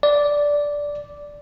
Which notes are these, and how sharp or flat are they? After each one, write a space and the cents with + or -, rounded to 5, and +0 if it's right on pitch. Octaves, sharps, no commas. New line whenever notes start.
D5 -10